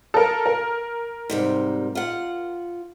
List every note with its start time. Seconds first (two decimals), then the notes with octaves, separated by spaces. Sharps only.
0.14 A4 A#4
0.46 A#4
1.30 G#2 C3 G3
1.95 F4 F#5